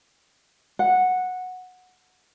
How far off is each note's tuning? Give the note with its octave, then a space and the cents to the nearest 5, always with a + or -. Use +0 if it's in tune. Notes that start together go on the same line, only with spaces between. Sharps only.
F#5 -10